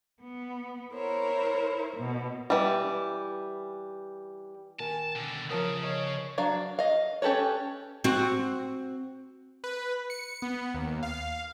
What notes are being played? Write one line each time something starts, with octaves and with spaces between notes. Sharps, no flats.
B3
E4 A#4 C5 C#5
B2
E3 G3
D#3 A#4 G#5 A5
B2 D3
E2 C#3 F3 C#4 A#4 C#5 A5 D#6
C#5 D#5
F#3 D4 F5
D#5 F5
C#4 G4 A4 B4 C#5
C4 F#4
B4
C#7
B3
D#2
F5